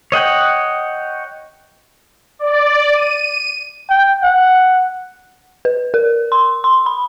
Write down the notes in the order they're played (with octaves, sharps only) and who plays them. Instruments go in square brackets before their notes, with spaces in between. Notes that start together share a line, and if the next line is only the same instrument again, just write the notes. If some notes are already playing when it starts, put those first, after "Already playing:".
[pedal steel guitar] C#5 D#5 F#5 G5
[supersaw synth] D5
D#7
[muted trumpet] G5
F#5
[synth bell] B4
A#4
C6
C6
B5